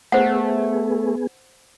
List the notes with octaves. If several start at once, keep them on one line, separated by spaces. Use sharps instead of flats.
A3 B3 G#4 C5 F#5